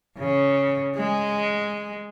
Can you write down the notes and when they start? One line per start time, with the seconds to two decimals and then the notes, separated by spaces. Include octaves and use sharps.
0.18 C#3
0.96 G#3